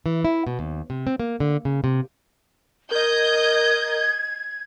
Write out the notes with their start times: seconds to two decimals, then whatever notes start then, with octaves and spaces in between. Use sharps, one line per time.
0.06 E3
0.25 E4
0.47 B2
0.59 D#2
0.90 C3
1.07 C4
1.20 A#3
1.40 D3
1.65 C#3
1.84 C3
2.91 A#4 D#5 G6 G#6